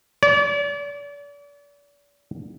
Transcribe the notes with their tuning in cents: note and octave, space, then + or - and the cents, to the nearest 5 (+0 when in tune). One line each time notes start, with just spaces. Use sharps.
D5 -40